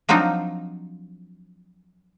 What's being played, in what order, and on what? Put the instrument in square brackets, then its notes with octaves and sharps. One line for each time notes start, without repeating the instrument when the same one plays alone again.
[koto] F3 F#3 C4 D4 D#4 F4